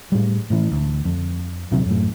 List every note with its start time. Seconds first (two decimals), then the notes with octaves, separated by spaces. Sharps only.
0.12 A2 G3
0.50 A2 E3
0.71 D2
1.05 F2
1.71 D#1 C3 F#3
1.86 F#2 A2